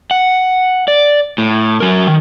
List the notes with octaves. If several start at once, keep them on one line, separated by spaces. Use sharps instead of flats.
F#5
D5
A2
F#3 A#4
D#3